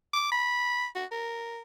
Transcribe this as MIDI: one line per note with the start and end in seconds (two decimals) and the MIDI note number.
0.13 0.31 86
0.32 0.87 83
0.95 1.05 66
1.12 1.62 70